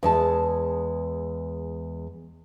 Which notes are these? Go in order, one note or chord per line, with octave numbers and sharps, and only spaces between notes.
E2 G#3 A5